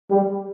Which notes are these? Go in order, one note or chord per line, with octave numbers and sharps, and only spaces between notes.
G3